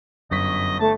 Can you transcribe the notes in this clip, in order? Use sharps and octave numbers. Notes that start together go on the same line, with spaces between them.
G1 F#2 D#5 C#6 B6
A3 A5